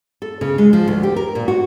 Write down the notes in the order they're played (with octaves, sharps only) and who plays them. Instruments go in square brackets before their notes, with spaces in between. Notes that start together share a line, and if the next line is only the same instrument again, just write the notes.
[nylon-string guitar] A4
C#3
G#3
F3
D2
G4
A#4
A#2
F#4